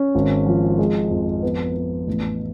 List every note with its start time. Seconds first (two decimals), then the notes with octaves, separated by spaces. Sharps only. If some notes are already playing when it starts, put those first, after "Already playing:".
Already playing: C#4
0.15 G#1
0.46 F3
0.79 G#3
1.11 F2
1.43 B3
1.75 B3
2.07 A1